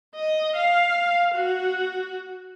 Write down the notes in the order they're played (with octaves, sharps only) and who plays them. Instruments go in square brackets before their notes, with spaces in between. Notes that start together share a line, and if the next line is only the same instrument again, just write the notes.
[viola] D#5
F5
F#4